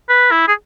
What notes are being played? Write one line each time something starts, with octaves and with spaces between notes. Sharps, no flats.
B4
E4
G#4